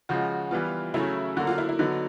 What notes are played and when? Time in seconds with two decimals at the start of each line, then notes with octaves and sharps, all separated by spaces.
0.09 C#3 F3 G#3 F#4
0.51 E3 G3 B3 F4
0.94 C#3 F#3 A3 C#4 E4
1.37 D3 F#3 A#3 F#4
1.47 F4
1.58 E4
1.69 E4
1.79 D3 F#3 B3 D#4